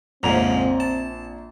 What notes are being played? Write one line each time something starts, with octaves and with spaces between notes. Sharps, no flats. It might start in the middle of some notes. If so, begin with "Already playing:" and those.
A#1 F2 G#2 C#3 C4 A#5 F7
A5